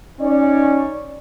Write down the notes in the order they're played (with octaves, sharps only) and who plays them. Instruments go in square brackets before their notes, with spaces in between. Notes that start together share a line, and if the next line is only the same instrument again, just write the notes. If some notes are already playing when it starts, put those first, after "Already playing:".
[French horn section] C#4 D#4 C#5 D5